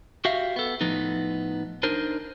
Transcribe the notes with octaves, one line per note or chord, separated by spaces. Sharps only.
F#4 G4 E5 F5
B3 A4
A2 F3 B3 D#4
D4 D#4 A#4 C5